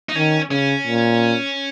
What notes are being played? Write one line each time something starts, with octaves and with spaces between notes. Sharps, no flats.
D#4
D#3 C#4
C#3 C#4
A#2